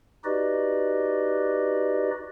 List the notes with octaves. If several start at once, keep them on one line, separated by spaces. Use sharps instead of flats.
D#4 F#4 G4 B4 D5 D#5